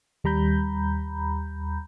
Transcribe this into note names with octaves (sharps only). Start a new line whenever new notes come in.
D#2 G3 A#5 B5 G6